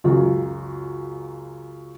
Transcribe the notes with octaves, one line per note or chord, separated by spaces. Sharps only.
C#2 F#2 C#3